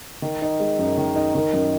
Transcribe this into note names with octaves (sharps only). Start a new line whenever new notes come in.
D#3
D#4
G#3
F#2
D#3
D#4
D#3
F#2